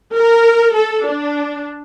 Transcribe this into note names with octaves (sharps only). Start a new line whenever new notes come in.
A#4
A4
D4